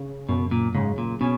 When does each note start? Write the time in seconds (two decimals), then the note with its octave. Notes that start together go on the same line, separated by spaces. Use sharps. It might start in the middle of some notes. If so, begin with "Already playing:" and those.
Already playing: C#3
0.29 F#2 B2
0.51 A#2
0.75 G#2 C#3
0.98 A#2
1.21 B2 C#4